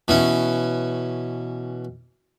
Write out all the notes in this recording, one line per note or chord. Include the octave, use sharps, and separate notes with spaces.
B2 E3 C#4